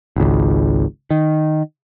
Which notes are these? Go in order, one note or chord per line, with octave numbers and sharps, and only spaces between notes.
G#1 C#2
D#3